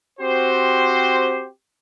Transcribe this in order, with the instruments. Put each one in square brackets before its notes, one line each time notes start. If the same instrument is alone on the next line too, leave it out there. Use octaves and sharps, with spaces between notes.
[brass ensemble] C4 F#4 G4 C5